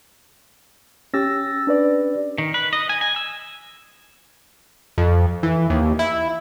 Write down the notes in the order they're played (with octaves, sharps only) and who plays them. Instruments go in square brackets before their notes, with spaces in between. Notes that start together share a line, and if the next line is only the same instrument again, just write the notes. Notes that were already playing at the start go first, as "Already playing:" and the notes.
[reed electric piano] C#4 G4 [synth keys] E6 A6 A#6
[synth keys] D4 B4 D5
[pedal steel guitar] D#3
B4
D#5
G#5
G#5
E6
[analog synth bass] F2
E3
D#2
E4